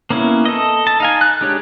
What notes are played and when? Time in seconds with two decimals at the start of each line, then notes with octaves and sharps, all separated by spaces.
0.10 A#3 B3 C#4 E4
0.45 A4 D#5
0.87 A5
1.00 D#4 F5 G#5
1.21 F#6
1.41 G#3 D4 G4 C#5